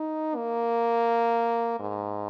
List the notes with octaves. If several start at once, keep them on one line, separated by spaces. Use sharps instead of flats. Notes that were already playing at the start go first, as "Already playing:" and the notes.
Already playing: D#4
A#3
G#2